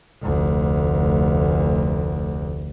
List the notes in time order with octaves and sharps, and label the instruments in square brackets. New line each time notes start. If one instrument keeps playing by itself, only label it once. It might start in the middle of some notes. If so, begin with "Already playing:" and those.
[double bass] F1 D2